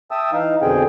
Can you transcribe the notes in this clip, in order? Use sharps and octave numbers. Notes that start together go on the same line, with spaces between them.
E5 G5 A5 D#6 E6
E3 D#4 F5
F2 B2 D3 C4 G#4 G5